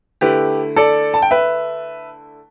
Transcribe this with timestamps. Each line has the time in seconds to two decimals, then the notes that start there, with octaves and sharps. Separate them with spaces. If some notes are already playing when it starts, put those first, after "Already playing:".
0.21 D3 A3 E4 G4 B4
0.76 A4 D5
1.14 A5
1.22 G5
1.31 B4 E5